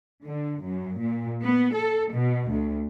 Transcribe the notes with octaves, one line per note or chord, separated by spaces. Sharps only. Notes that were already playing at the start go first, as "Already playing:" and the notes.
D3
F#2
A#2
B3
A4
B2
D2